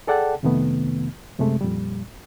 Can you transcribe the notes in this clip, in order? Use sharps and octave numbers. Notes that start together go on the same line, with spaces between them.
G#4 A4 D5 F#5 G5 A5
F2 C3 D#3 A3 B3
F#2 C3 G#3 A3
F2 A#2 G3